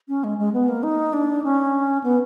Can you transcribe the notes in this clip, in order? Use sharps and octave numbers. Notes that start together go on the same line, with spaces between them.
C#4
G#3
G#3
B3
A#3
D#4
D4
C#4
B3